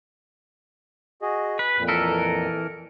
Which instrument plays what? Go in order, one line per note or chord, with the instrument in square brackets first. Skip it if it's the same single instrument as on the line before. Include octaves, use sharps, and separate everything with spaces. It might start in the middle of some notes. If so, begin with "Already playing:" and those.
[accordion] F#4 G#4 D#5
[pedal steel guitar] B4
[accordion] F2 A#2
[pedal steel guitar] E3 A4 A#4